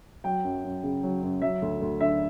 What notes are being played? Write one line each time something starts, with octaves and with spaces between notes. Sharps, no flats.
F#3 G5
F#2
F#2
C#3
F#3
F#2
F#3 E5
D2
D2
D3 E5